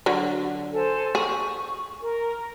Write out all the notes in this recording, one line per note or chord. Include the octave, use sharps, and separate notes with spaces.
D3 F#3
A4 C5 G#5
G#4 C#6
A#4